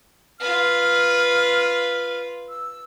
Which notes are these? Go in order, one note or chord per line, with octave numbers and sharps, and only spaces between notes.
F4 B4 F6
E6